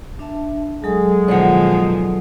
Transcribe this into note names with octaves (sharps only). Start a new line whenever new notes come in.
D4 E5 A5
F#3 G#3 G#4 A4 D#6
B2 D#3 F3 D5 F#5